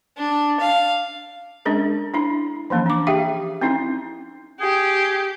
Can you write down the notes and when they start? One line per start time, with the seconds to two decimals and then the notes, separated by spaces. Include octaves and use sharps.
0.17 D4
0.60 F5
1.66 G#3 C#4 D4 G#4 A#4
2.14 D4 E4 B5
2.70 E3 F3 A#3 C#4
2.86 D4 D6
3.07 G4 G#4 E5 F5 G5
3.62 C4 C#4 D#4 E4
4.61 G4 G#4